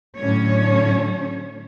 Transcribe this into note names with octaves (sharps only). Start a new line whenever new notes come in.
A2 D3 F#3 C#4 C#5